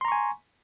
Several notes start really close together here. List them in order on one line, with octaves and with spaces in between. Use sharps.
C6 A#5 C#6 G#5